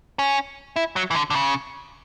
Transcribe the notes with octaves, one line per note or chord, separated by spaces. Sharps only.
C#4
E4
F#3
E3
D3
D3
C#3